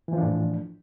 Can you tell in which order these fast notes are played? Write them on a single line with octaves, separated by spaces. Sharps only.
E3 F3 D4 A2